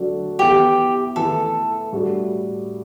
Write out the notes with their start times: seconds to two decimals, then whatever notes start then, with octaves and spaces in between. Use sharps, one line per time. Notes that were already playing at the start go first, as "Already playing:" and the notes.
Already playing: D3 F#3 A3 D4 F#4
0.39 E3 B3 E4 G4 A4
1.16 E3 A3 E4 A4
1.92 A2 G3 D4 F#4 A4